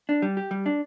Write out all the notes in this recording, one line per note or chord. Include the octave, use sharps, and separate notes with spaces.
D4
G3
G4
G3
D4